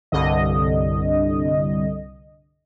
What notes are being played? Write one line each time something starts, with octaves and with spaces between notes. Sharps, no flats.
C2 G2 D3 D#5